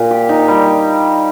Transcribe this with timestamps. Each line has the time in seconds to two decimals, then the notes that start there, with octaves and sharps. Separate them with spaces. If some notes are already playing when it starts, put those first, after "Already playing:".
Already playing: A#2
0.11 G4
0.29 D#4
0.48 G3